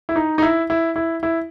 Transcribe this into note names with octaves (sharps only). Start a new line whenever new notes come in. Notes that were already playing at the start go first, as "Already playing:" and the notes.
E4
D#4
D#4
E4
E4
E4
E4